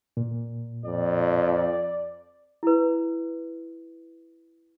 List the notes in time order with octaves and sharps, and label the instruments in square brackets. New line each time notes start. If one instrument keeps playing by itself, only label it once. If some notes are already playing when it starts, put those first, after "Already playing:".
[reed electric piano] A#2
[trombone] F2 [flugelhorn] D5
[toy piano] E4 B4